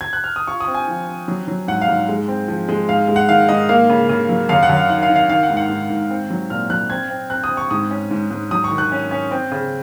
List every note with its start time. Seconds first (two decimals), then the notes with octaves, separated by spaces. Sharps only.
0.01 G#6
0.13 F#6
0.24 F6
0.36 D#6
0.47 F4 C#6
0.60 D#6
0.67 C4
0.74 G#5
0.88 F3
1.08 C4
1.28 F#3
1.48 F#3
1.68 G#2 F#5
1.82 F5
1.88 G#2
2.09 G#3
2.28 C4
2.48 F3
2.69 G#3
2.89 G#2 F5
3.08 G#3
3.16 F#5
3.29 D#3 F5
3.49 G#2 D#5
3.69 A#3 F5
3.89 C#3
4.09 C#3
4.29 F#3
4.49 F#2 F5
4.63 F#5
4.69 F#2
4.77 F5
4.89 D#3 F#5
5.03 F5
5.09 D#3
5.16 F5
5.29 D#3 F5
5.43 F#5
5.50 G#2
5.57 F#5
5.69 G#2
5.90 G#2
6.10 C4
6.30 F#3
6.50 A#2 F6
6.70 F#3 F#6
6.90 C4 G#6
7.10 C4
7.30 C4 F#6
7.44 D#6
7.50 C4
7.57 C#6
7.71 G#2 D#6
7.91 C#4
8.11 G#2
8.31 G#2
8.51 F#3 D#6
8.64 C#6
8.71 D#3
8.78 F#6
8.92 C#4
9.11 C#4
9.31 C4
9.51 C#3